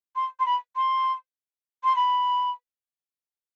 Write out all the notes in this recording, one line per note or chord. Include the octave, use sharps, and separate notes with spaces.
C6
C6
B5
C6
C6
B5